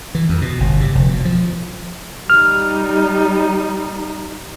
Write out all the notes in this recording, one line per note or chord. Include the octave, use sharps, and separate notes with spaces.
E3
F2
B2
G1
C3
F1
B2
F3
G3 D#4 F6